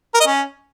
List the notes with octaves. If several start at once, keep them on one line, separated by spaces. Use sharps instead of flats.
A#4
D#5
C#4